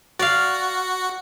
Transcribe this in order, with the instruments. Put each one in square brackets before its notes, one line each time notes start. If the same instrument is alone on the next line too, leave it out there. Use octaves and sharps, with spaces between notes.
[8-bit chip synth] F#4 [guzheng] D5 F5